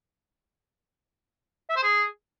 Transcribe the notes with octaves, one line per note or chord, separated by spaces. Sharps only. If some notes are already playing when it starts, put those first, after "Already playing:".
E5
C5
G#4